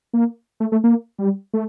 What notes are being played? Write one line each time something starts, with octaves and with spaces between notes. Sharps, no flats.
A#3
A3
A3
A#3
G3
A3